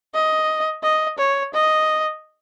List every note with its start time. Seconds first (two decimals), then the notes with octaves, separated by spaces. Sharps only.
0.14 D#5
0.83 D#5
1.19 C#5
1.54 D#5